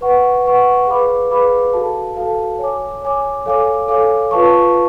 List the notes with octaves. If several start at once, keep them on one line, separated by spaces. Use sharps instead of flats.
B4 F#5 C#6
B4 F#5 C#6
G#4 B4 F5 B5 D6
G#4 B4 F5 B5 D6
F#4 A4 F5 A5
F#4 A4 F5 A5
C#5 G#5 D6
C#5 G#5 D6
A4 C#5 F5 G#5 D6
A4 C#5 F5 G#5 D6
F4 B4 F5 A5 C#6